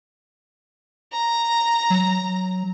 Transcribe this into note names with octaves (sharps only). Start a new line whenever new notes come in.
A#5
F#3